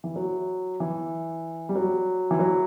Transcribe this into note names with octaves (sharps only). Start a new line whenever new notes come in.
E3
F#3
E3
G3
F#3
E3
F#3